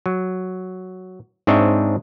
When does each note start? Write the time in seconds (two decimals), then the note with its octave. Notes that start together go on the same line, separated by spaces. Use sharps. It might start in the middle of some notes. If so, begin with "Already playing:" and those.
0.06 F#3
1.47 G#2 C4 D4 C#5 D#5 E5